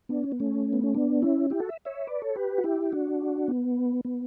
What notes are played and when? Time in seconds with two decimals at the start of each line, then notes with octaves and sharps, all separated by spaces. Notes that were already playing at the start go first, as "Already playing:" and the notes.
0.09 B3 D4
0.24 C#4
0.32 B3
0.40 A3 C#4
0.73 B3
0.84 C#4
0.95 B3 D4
1.22 C#4 E4
1.50 E4 G4
1.60 F#4 A4
1.69 E5
1.85 C#5 E5
2.07 B4 D5
2.22 A4 C#5
2.35 G4 B4
2.58 F#4
2.64 E4 G4
2.92 D4 F#4
3.48 B3
4.05 B3